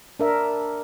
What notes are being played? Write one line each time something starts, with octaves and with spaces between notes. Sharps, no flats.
D4 A#4 E5